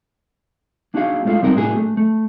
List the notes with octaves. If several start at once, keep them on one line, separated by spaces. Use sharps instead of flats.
A#3 D4 D#4 F#4 G#4 F5
G#3 A3 B3 F4 A4 F5
C3 G3 C4 D#4 F#4 A#4
A2 A#3 D4 F#4 G#4
A3
A3